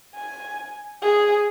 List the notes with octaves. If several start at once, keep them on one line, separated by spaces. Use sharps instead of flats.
G#5
G#4